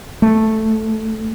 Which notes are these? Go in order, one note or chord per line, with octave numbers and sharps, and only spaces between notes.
A3